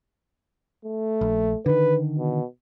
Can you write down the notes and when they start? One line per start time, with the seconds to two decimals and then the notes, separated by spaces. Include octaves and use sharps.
0.85 A3
1.21 A#1
1.66 D3 D#3 B4
2.18 B2